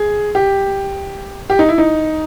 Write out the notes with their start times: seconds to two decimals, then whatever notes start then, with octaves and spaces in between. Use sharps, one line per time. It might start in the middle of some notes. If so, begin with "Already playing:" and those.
Already playing: G#4
0.35 G4
1.50 G4
1.59 D#4
1.69 E4
1.78 D#4